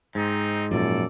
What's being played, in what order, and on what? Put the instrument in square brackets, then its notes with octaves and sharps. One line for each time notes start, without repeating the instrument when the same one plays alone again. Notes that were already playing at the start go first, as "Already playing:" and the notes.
[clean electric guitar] G#2 [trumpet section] C4 D#4
[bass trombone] F#2 [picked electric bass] A#2 F3 [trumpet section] A4 D5